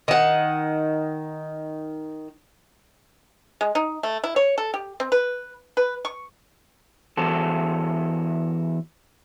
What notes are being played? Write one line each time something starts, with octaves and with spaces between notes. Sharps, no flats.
D#3 F#5
G#3
D#4
A3
E4
C#5
A4
G4
C4
B4
B4
C#6
E2 F#4 A4